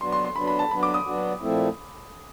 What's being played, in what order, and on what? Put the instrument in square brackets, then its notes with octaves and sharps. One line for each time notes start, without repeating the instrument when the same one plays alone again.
[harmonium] F#3 B3 D4 F#4 [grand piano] C6
[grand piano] C6
C6
[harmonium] F#3 B3 D4 F#4 [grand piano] B5
[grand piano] B5
A5
[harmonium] F#3 B3 D4 F#4 [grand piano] B5
[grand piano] D6
D#6
[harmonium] F#3 B3 D4 F#4
A#2 F3 A3 C4 E4